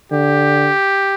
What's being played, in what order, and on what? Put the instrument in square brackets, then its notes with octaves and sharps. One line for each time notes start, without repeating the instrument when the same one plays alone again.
[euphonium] D3 [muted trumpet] G4